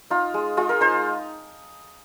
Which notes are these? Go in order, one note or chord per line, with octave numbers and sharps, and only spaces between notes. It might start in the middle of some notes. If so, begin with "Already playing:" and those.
D#4 F4
G#3
G#3 F4
A#4
D#4 C5